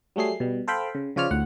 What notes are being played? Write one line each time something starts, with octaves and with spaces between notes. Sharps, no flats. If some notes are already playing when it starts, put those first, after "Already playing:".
F#3 G3 A3 G#4 C7
B2 G3
A4 C5 F5 G5 B5
C#3
C#3 F3 F4 C#5 D5 F6
D2 A2 F#5